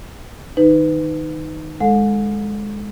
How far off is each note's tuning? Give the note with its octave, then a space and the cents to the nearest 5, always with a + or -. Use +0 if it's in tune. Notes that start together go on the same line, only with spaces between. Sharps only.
D#3 -15 D#4 +0 B4 +20
G#3 +0 A4 +0 F#5 -45